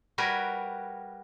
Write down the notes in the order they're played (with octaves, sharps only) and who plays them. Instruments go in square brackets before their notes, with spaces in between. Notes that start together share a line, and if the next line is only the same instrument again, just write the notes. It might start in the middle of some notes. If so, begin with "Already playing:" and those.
[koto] G3 F#4 G4 A#4 B4 C#5